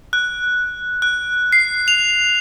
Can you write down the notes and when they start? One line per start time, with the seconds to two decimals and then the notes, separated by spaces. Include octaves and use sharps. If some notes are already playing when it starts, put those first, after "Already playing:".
0.13 F#6
1.02 F#6
1.53 C7
1.88 F7